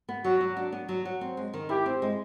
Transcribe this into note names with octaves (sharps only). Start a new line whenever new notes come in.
B3
F#3 F#4
F#3
D4
B3
F#3
F#3
C4
G#3
D#3
E4 G4
C4
G#3